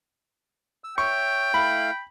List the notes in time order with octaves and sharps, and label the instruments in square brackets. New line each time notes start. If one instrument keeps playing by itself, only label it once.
[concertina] E6
[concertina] C#5 E5 [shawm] G5 [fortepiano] C#6
[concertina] A3 E4 F5 [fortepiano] B5